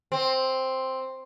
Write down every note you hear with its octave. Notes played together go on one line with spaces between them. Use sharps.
C4